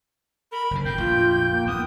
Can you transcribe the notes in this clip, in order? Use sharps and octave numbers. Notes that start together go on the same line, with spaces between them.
A#4 B5
F#1 D3
A2 G5 G6
A#1 F2 F4
A#3
D#2 B3 D#6